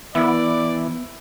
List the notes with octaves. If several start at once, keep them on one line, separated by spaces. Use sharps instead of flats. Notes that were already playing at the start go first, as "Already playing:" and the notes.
E3 B3 E4 D5